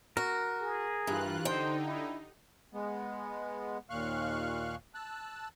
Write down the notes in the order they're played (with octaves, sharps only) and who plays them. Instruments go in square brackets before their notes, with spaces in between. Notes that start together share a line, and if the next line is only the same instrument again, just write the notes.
[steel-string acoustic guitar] F#4 [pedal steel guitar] A#4
[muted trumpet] G#4
[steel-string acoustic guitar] G2 [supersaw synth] E3 F4 F#6
[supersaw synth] D3 D#4 [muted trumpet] C5 [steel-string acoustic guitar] G5
[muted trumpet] E4
[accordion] G#3 B3
D#2 A#2 F5 C#6 F6 F#6
A5 E6 F#6